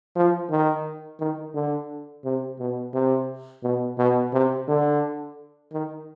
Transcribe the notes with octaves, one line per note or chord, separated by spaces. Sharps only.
F3
D#3
D#3
D3
C3
B2
C3
B2
B2
C3
D3
D#3